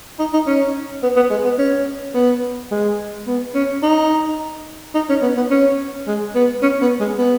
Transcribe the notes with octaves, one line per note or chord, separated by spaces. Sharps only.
D#4
D#4
C#4
B3
B3
G#3
B3
C#4
B3
G#3
B3
C#4
D#4
D#4
C#4
B3
B3
C#4
G#3
B3
C#4
B3
G#3
B3